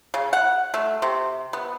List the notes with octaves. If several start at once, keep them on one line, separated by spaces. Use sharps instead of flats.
C#3
F#5
A3
C3
B3